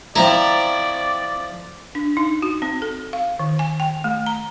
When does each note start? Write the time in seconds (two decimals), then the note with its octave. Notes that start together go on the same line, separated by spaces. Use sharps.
0.16 F3 C4 E4 D5 A#5
1.95 D4
2.17 D#4
2.42 F#4
2.62 C4
2.82 A4
3.13 F5
3.39 D#3
3.59 G#5
3.80 G5
4.04 A3
4.26 A#5